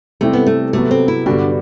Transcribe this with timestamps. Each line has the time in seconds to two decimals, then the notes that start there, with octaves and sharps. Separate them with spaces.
0.21 C3 G3 A3 C4 E4 G4
0.33 B3
0.46 A3
0.73 C3 F#3 A3 B3
0.91 C4
1.08 E4
1.26 G2 D3 G3 B3 D4 F#4